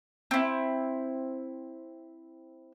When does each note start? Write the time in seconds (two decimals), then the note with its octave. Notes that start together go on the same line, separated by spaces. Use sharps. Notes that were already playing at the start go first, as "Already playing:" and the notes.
0.31 C4 E4